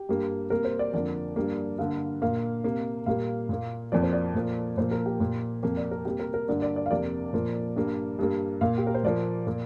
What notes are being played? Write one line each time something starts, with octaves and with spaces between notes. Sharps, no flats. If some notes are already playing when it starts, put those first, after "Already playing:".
Already playing: G4
G2 G3 A#3
C3 G3 A#3 A#4
C5
D5
F2 D3 F3 A#3 D5
G2 G3 A#3
G2 D3 A#3 F5
A#2 A#3 F5
C3 A#3
A#2 G3 A#3 F5
A#2 A#3
F2 F3 A#3 D5
C5
D5
A#2 F3 A#3
A#2 F3 A#3 C5
A#4
G4
A#2 A#3
F2 C3 A#3 G4
D5
A#4
C3 G3 A#3 G4
A#4
A#4
G2 D3 A#3 D5
D5
D5
F5
F2 C3 A#3 D5
A#2 F3 A#3
G2 G3 A#3
G2 G3 A#3
A#2 A#3 F5
G4
A#4
C5
A#2 F3 A#3 D5
A#2 A#3